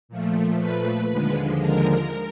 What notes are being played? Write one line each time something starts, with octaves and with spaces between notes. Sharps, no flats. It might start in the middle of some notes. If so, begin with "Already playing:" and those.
A#2 F3 A3
B4
D#2 D3 F3 G#3
A#4